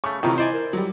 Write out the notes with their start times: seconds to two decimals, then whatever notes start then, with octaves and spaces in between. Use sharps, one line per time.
0.04 C#3 A3 C#6
0.23 A2 C3 D#3 E3 F4 A#5
0.38 E4 C5 D5 D#5 G#5
0.53 A#4
0.73 F#3 G3